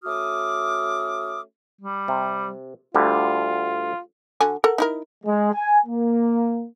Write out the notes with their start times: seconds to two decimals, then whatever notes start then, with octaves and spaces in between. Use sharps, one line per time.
0.04 A3 C#4 F#4 D6 D#6 F6
1.81 G3
2.08 C3
2.95 D2 D3 G3 F4
4.40 D3 F#4 G#5
4.64 A4 A#4 F#5
4.78 D#4 E4 A#4
5.25 G#3
5.53 G#5
5.87 A#3